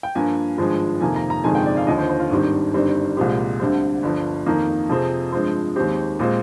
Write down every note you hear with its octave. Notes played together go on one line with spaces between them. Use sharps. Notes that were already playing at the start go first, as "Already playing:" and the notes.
G5
G2 F3 A#3 G#5
G#1 G2 F3 G#3
F2 C3 D#3 A#3 G#5
A#5
A#5
G1 F2 C3 D#3 G#3 G#5
G5
D5
F5
D#2 D3 F3 D#5
C5
C5
F4
G#1 G2 D#3 G3 C4
G1 G2 D#3 G3 C4
C2 A#2 F3 G#3 C4 G4
D2 D3 G3 C4
G1 G2 F3
F2 D#3 A#3
F2 C3 F3 C4 G#4
G2 F3 G#3 C4
D#2 D#3 G#3 C4 G4
A#2 G#3 C4